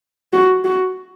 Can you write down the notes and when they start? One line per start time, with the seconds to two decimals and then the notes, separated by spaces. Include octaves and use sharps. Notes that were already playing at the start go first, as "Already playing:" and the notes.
0.33 F#4
0.64 F#4